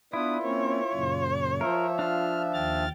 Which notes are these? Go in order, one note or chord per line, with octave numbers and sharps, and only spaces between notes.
B3 D4 E4 F4 B4 D#6
A#3 C4 C#4 C#5
F#2 A#2 C#3
F3 F4 A#4 E5
D4 F4 F6
D#2 G5 F6 A6